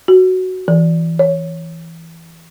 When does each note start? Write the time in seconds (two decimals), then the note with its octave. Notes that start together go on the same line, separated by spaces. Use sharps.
0.08 F#4
0.68 E3
1.19 C#5